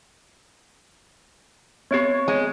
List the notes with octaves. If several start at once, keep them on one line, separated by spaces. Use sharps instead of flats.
B3 C4 G4 C#5
G#3